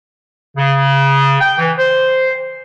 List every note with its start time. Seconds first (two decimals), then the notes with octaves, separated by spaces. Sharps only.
0.56 C#3
1.39 G5
1.59 E3
1.77 C5